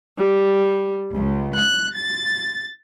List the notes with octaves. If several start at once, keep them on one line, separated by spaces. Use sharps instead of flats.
G3
C#2
F#6
A6